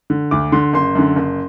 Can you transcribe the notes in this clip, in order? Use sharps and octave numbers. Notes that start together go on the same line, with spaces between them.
D3
D2 D6
D3 C6
F#1 C6
F#2 D3
F#1